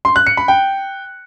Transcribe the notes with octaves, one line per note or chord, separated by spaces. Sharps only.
C6
F#6
C#7
B5
G5